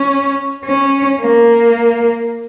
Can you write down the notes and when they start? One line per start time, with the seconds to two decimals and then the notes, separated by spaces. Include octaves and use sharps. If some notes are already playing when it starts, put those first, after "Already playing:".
Already playing: C#4
0.64 C#4
1.22 A#3